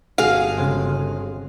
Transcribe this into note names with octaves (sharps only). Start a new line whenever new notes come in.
G1 F#4 G#4 F5
C#3 G#3 C4